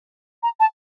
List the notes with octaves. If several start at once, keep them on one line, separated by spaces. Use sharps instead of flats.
A#5
A5